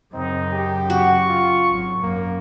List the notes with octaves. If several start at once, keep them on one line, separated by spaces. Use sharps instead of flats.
F#2 C#3 C4 D#4
G4
F#4 C#6
F4
G#1 F#3
F#2 A#3